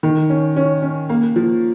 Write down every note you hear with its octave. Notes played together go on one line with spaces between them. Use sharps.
D#3
C#4
C#4
C#4
A#3
F3